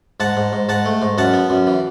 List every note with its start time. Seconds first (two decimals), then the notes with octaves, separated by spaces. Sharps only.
0.20 G#2 F#5 A5
0.37 G#2
0.53 G#2
0.69 G#2 F#5 A5
0.86 A3
1.02 G#2
1.18 F#2 F#5 A5
1.34 B3
1.50 F#2
1.67 E3